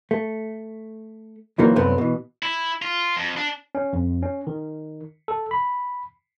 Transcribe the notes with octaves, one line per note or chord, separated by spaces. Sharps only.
A3
D2 A#2 D#3 E3 F#3 A#3
C2 F#2 F#3 A3 B3 C4
B2 E3
E4
F4
F2
D4
C#4
F2
C#4
D#3
A4
B5